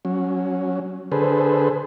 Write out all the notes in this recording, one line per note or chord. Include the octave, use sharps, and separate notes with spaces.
F#3 C#4
D3 G#4 A4 B4 C5